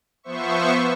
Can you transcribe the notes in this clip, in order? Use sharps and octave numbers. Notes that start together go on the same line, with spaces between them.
F3 B3 C5 E5 C#6